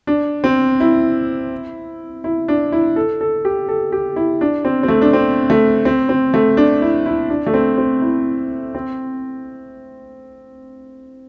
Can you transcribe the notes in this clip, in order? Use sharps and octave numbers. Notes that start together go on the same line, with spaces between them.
D4
C4
E4
E4
D4
E4
A4
A4
G4
A4
G4
E4
D4
C4
C4
A3
D4
C4
A3
C4
C4
A3
D4
E4
E4
D4
A3
C4
C4
E4
C4